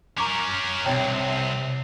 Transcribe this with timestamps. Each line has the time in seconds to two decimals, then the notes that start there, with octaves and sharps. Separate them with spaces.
0.18 C#4 A#4 A#5 C#6 D6
0.85 C2 C3 C#5 G5 A5